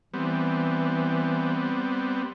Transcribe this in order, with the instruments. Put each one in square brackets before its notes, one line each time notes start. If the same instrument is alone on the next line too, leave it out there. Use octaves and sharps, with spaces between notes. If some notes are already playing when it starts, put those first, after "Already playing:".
[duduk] E3 [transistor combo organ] G3 B3 C4